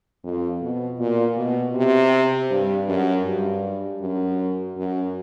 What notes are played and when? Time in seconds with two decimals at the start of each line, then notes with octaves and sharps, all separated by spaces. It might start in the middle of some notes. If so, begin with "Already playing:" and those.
0.24 F2
0.62 B2
0.99 A#2
1.37 B2
1.75 C3
2.50 G2
2.88 F#2
3.25 G2
4.01 F#2
4.77 F#2